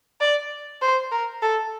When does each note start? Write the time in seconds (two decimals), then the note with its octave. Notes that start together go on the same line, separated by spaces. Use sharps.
0.21 D5
0.82 C5
1.11 A#4
1.42 A4